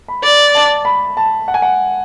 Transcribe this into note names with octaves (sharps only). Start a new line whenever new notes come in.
B5
D5
A5
B5
A5
F#5
G#5
F#5